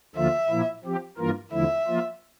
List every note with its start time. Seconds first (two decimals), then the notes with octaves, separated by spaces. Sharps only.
0.15 D2 D3 F3 A#3 F4 E5
0.49 A#2 F3 A#3 E4
0.84 F3 C4 G4
1.18 G2 E3 A#3 F4 A#4
1.52 E2 D3 F3 A3 E4 E5
1.87 F3 A#3 F4